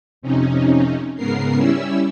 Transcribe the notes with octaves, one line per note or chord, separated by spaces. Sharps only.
F2 C3 C#4 D#4
G#2 C#3 B3 A#4 C7
G3 C#4 E4 E6